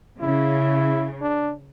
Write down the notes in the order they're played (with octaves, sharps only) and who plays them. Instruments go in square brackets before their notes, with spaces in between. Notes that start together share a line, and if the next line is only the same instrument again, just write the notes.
[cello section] C#3 [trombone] E4
[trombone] D4